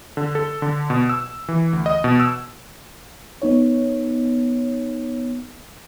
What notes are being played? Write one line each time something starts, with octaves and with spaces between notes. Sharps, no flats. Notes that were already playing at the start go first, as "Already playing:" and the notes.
D3
A4
D3
B2
E6
E3
D2
D#5
B2
E6
B3 D#4 C#5